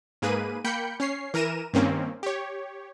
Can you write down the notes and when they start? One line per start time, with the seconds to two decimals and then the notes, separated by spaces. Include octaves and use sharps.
0.22 G#2 A#3 G#4 B4 D#7
0.64 A#3 G5 B5 G6 C#7
1.00 C#4 C#5 C7
1.34 E3 A#4 A#5 D#7 E7
1.74 G2 D#3 A#3 C4 C#4
2.23 G4 C#5